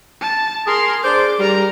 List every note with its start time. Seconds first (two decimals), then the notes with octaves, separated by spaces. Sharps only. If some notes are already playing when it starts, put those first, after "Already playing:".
0.21 A5
0.67 G#4 A#4 C6
1.04 D4 G#4 C5 D6
1.40 G3 A#4 A#5